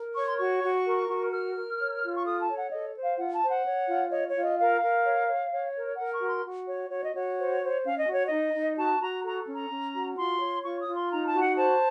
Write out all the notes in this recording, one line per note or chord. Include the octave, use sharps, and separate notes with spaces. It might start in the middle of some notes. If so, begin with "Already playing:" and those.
Already playing: A#4
C#5 C#6
C6
F#4 C#6
F#4
A#4
F#4
A#4 F6
A#4
C#5
F4
C#6
A4 D#6
A5
C#5
F#5
A4 D#5
C5
F5
F4 F#5
A5
C5
F#5
C#5
F4
C#5 D#5
C#5
F4
D#5
A#4 F5
A#4
C#5
C#5
C#5
A#4
A#4 F#5
C#6
F#4
C6
F#4
C#5
F#4 C#5
D#5
F#4 C#5
C5
C5
C#4 F5
D#5
F#4 C#5
D#4 D#5
D#4
F#4 A5
F#4 A#5
A4 A#5
C#4
A#5
C#4
F#4
F4 C6
C#5
F4 C#6
D#6
F4
C6
D#4 A#5
A5
F#4
F#5
C5 A5